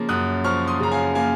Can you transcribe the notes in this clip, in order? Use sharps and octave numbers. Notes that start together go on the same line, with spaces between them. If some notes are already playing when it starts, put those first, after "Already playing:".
Already playing: C#3 F3 A#3
F#2 D#6 F#6
F3 C#6 F6
C6 D#6
C#3 A#5
F5 G#5
A#3 F5 G#5